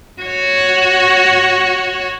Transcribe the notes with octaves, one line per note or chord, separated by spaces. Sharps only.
F#4 C#5